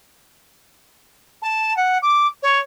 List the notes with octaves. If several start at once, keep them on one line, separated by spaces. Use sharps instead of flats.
A5
F#5
D6
C#5